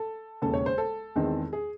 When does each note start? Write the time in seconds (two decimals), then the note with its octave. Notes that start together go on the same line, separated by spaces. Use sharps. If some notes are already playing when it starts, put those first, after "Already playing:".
Already playing: A4
0.42 E1 D#2 C#3 A4
0.54 C#5
0.66 C5
0.78 A4
1.16 E2 D#3 G#3 C4
1.53 G#4